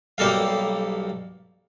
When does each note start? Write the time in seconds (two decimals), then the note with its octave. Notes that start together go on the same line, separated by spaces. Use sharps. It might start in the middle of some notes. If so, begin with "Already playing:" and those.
0.18 B1 G3 A#3 A4 F5